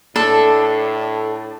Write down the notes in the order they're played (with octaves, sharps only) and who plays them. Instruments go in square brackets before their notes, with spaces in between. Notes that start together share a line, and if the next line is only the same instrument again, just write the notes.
[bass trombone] A2 [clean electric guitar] D4 [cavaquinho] A4